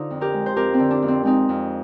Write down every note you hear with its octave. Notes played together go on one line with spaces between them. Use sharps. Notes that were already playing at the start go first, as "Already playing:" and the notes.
Already playing: D3 D#4 F4 C5
F2
G4 A#4
G#3
C5
F2 G4 A#4
C4
D3
D4
F2
C4
G#3 C4 D#4
F2